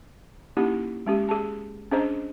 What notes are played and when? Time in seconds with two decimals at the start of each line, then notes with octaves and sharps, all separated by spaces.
0.57 A#3 C#4 D#4 E4 G4
1.06 G#3 C#4 G4
1.29 G#4 A5
1.91 C#4 D4 G#4 C5 D#5 A#5